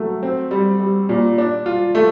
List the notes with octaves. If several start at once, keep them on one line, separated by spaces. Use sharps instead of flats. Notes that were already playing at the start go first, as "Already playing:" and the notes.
Already playing: F#3 A3
C4
G3
G3
A#2
D4
F4
A3